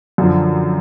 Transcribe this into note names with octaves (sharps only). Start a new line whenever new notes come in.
F#2 D3 F3